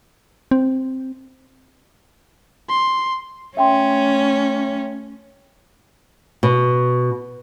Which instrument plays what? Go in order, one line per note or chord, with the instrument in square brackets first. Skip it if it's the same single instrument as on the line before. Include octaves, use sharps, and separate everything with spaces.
[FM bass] C4
[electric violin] C6
[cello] A3 C#4 [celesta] E5 G5 C6
[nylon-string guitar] B2